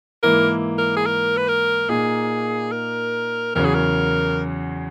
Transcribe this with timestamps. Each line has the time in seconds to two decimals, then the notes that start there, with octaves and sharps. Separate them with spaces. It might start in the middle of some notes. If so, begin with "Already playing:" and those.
0.23 G#2 E3 A#3 E4 A#4
0.78 A#4
0.97 G#4
1.06 A#4
1.37 B4
1.48 A#4
1.89 A#2 A#3 D#4 G#4
2.72 A#4
3.55 E2 C#3 F#3 C#4 A#4
3.65 G#4
3.75 A#4